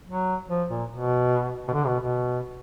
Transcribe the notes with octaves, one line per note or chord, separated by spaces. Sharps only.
F#3
F3
A#2
B2
B2
D3
B2
B2